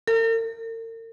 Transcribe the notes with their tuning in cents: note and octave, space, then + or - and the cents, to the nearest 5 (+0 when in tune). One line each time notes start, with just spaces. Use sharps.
A#4 -45